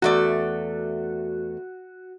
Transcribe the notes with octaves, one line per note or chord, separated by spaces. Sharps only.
E2 A3 F#4 D5